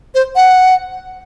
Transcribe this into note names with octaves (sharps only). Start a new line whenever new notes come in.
C5
F#5